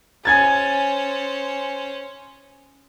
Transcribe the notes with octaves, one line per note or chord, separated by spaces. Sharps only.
C#4 C5 G#5 G#6 A6